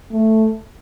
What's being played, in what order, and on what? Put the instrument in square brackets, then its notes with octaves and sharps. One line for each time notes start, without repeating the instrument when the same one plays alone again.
[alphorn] A3